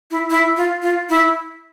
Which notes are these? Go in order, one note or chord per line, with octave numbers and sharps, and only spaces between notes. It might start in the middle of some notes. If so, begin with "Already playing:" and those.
E4
E4
F4
F4
E4